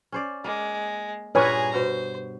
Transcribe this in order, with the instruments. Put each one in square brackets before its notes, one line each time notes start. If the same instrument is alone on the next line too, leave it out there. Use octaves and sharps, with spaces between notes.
[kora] C#4 C5 D5
[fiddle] G#3 [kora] A#3
[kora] G2 A#2 A#4 [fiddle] G#4 A#5 [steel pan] B4 C#5 G#5
[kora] B2 [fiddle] C5